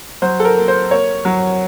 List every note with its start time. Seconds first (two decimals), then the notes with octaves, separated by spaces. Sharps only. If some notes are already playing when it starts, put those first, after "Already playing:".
0.22 F#3 C5
0.40 A4
0.45 A#4
0.57 A#3
0.68 C5
0.91 A#3 C#5
1.25 F#3